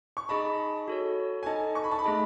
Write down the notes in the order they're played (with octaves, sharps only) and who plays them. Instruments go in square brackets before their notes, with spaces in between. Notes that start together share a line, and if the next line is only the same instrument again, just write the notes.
[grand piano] C#6
[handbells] D#4 G#4 D#5 A5 [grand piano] B5
[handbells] F#4 A4 C#5
[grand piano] G#5
[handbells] D#4 A4 D#5 [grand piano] A5
[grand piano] C#6
B5
A5
B5
[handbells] A3 D#4 G#4 D#5